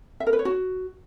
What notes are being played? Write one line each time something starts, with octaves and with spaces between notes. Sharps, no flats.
E5
A#4
B4
C#5
F#4